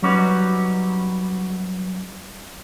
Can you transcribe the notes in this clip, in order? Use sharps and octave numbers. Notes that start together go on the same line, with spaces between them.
F#3 G3 C#4 D#4 F#4 B4